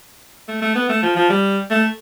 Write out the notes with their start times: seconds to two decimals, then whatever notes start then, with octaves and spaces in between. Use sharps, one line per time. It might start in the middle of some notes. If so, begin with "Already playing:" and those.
0.48 A3
0.62 A3
0.76 B3
0.89 A3
1.03 F3
1.16 F3
1.30 G3
1.71 A3